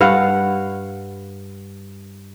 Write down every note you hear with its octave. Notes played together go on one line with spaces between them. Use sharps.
G2 F5 F#5